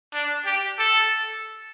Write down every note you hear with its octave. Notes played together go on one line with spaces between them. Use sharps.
D4
G4
A4